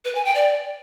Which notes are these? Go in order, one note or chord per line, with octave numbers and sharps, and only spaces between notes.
B4
G#5
G5
D5